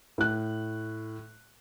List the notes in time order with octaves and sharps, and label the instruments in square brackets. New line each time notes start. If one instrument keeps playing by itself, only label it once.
[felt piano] A2 F#6